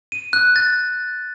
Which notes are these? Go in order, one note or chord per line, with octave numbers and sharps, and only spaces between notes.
D#7
F#6
A6